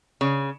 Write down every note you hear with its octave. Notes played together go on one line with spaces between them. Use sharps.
C#3